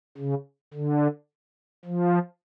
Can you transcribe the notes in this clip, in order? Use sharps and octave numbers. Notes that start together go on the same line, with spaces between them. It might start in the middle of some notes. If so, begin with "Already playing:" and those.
C#3
D3
F3